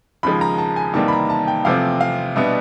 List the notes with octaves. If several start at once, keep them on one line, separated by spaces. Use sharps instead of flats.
D#2 C#3 F3 G#3 B5
A#5
A5
G#5
E2 C3 D#3 G3 A#3 A5
B5
A#5
A5
G5
E2 C3 F3 A3 C4 F5
F5
B2 G3 B3 D4 E5